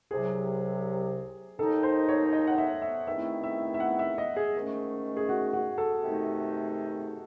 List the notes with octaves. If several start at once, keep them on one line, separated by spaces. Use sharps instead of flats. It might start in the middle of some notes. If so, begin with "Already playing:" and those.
C2 C3 F#3 G#4
D#2 D#3 G#3 D#4 A4
C5
C#5
D#5
F#5
E5
E5
E2 D#3 A3 C4 E4 E5
E5
E5
F#5
E5
D#5
G#4
G#2 D#3 A3 C#4
G#4
F#4
F#4
A4
C3 D#3 A3 D#4